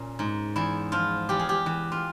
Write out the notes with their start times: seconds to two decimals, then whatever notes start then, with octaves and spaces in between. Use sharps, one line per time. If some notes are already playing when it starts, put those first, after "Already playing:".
Already playing: A#2 C#4
0.19 G#2
0.56 E2 E4
0.92 F3 F4
1.29 E2 G4
1.40 G#4
1.49 G4
1.66 E3
1.92 F4